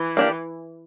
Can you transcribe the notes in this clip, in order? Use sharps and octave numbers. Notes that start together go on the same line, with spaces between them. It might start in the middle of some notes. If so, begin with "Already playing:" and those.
Already playing: E3
A#3 D4 G4